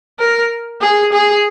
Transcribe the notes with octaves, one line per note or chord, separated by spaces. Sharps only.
A#4
G#4
G#4